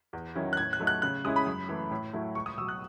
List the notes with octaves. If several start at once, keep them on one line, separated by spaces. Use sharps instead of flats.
E2
D#3 F#3 C#4 E4
F#6
A2 G#6
F#6
F#3 A3 D#4
F#6
C#3 F#6
G#3 C#4 E4 D#6
B5
F#2
E3 A3
A2
F#3 A3 E4
C#2 C#6
D#6
B2 F#3 E6
F#6